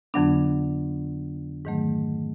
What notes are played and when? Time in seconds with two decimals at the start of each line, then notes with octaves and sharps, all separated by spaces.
0.14 F2 D3 F#3 B3 D4
1.65 G#2 D#3 F#3 A3